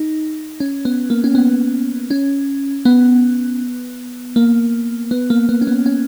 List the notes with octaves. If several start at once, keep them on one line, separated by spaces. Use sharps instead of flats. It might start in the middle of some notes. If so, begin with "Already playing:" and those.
Already playing: D#4
C#4
B3
A#3
C#4
B3
C#4
B3
A#3
B3
A#3
B3
C#4
B3
C#4